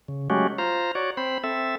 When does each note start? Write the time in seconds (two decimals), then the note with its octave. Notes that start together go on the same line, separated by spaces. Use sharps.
0.08 C#3
0.30 F#3 G#3 A3 C#4 F#4 G4
0.58 F4 C5 A#5
0.95 F#4 C#5 D5
1.17 C4 C5 B5
1.44 C4 A4 E5